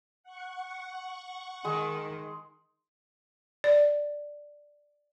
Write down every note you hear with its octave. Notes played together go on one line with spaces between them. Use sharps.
F#5 C#6
D#3 G#3
D5